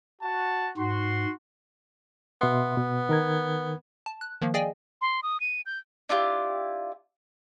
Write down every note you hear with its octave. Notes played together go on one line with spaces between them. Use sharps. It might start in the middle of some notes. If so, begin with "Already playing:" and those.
F#4 A5
G#2 F#4 C6
B2 B3 E5 C6
B2
D#3 A#4 G#6
A5
F#6
D#3 F3 A#3
G#4 D5 D#5 F5 G5 G#5
C6
D#6
D#7
G6
D4 E4 F4 G4